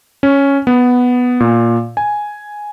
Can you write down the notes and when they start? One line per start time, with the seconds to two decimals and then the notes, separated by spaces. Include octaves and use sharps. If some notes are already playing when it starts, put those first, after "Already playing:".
0.23 C#4
0.67 B3
1.40 A#2
1.97 G#5